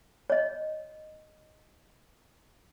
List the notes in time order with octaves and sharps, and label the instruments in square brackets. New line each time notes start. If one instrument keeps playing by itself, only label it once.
[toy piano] C#5 D#5